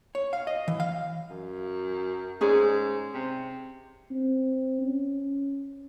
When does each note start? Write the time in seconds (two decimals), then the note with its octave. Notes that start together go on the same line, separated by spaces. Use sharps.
0.15 C#5
0.33 F5
0.47 D#5
0.68 E3
0.80 F5
1.30 F#2
2.41 G#2 C#4 G#4 D5
3.14 C3
4.11 C4
4.82 C#4